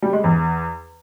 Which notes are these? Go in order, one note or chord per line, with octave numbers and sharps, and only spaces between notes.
G3
G#3
E2